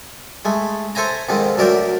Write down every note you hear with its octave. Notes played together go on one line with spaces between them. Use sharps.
G#3 A3
A4 C5 E5 G#5 A#5
F2 G#2 D#3 C4
D2 F#3 A#4 D5 E5 G5